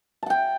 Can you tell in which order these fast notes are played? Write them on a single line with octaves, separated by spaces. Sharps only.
A5 F#5 G5